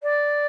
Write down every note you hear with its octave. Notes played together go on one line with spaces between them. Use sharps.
D5